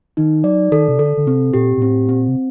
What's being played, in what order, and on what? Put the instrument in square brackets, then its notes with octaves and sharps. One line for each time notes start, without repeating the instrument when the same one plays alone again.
[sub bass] D#3 [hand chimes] D#4
[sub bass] F#3 [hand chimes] D5
[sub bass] D#3 [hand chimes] A4
[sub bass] C3
[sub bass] D3 [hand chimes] A4
[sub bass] D3
[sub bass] C3 [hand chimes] C4
[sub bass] A#2 [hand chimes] G4
[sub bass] A#2
[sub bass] A2 [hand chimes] C4
[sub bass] A#2 [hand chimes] C4
[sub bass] C3